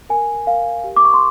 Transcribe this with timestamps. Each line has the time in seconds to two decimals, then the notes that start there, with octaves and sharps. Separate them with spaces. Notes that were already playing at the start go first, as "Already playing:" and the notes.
0.09 A#4 G#5
0.47 A#4 F5
0.84 G4
0.96 D6
1.05 C#6
1.14 C6